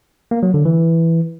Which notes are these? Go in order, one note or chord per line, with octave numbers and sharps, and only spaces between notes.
A#3
F#3
D3
E3